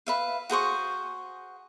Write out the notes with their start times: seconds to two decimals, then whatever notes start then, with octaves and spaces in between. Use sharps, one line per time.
0.07 B4 E5 F5
0.50 F#4 G#4 C5 C#6